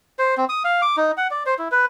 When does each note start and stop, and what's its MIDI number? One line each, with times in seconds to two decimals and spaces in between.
0.19 0.35 72
0.37 0.45 60
0.49 0.63 87
0.64 0.82 77
0.82 0.96 86
0.97 1.12 63
1.17 1.27 78
1.31 1.43 74
1.46 1.54 72
1.59 1.68 64
1.72 1.86 71